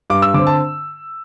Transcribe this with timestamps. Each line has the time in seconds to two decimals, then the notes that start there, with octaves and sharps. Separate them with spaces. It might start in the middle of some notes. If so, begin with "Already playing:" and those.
0.10 G2 D6
0.22 E6
0.34 D3 C4 D6
0.47 A5